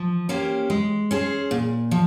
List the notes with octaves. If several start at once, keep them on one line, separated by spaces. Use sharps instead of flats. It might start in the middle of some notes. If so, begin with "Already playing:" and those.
Already playing: F3
A#3 C#4 G4 C5
G#3
C#4 G#4 C5
A#2
F3